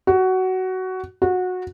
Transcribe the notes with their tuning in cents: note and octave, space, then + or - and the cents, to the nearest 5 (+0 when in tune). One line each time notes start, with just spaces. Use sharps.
F#4 +15
F#4 -20